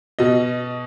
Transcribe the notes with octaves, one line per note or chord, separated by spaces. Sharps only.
B2 D#5